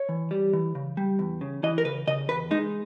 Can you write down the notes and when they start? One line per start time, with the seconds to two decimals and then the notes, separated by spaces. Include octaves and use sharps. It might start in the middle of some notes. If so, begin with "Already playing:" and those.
Already playing: C#5
0.09 E3
0.31 G3
0.53 E3
0.75 C#3
0.97 G3
1.19 E2
1.41 C#3
1.63 E3 D#5
1.78 A#4
1.85 C#3 B4
2.07 C#3 D#5
2.29 E2 B4
2.51 G#3 D#4